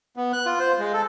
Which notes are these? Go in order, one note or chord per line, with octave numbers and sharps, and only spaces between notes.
B3
F#6
F4
C5
G#3
A4